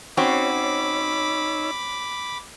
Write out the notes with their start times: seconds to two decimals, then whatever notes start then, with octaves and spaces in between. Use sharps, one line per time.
0.17 C4 C#4 D#4 F#4 C#5 B5 D6 E6